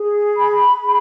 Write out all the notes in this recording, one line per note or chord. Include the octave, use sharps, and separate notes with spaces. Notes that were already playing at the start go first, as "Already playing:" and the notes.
Already playing: G#4
B5
G#4